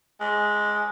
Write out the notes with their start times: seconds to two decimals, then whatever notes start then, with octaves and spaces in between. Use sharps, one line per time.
0.20 G#3